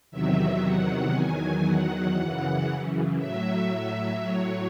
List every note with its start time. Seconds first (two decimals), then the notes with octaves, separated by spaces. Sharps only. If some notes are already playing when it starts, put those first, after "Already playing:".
0.11 E2 C3 D#3 F#3 E5
0.62 F#5
1.13 E2 D#3 F#3 G#5
1.65 F#5
2.15 F#2 C#3 E3
3.18 A2 F#3 E5
4.20 A2 F#3 C#5